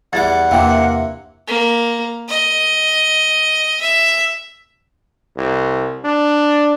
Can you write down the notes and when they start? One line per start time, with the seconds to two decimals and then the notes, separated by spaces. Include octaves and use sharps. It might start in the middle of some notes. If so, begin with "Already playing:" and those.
0.13 E2 G3 F#5 D6 G#6 A6
0.51 E2 C3 E3 A#3 F5 G5
1.48 A#3
2.28 D#5
3.81 E5
5.37 C2
6.04 D4